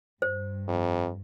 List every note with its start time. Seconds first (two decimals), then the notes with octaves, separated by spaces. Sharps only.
0.22 G2 C5
0.68 F2